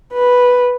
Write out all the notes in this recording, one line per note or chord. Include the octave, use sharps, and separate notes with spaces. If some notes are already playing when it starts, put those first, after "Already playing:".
B4